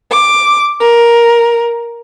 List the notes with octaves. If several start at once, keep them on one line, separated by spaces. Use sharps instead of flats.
D6
A#4